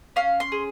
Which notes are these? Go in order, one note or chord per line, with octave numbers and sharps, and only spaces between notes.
C#4 F5
C6
G#4